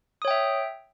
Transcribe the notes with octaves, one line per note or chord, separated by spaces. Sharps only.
C#5 E5 G5 D#6